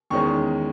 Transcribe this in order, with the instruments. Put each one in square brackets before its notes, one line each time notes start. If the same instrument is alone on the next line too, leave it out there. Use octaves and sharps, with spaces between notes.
[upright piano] E2 D#3 G#3 C#4 C#6